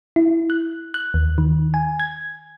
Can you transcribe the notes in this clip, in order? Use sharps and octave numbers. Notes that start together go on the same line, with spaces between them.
E4
F#6
F#6
D#2
D#3
G#5
G#6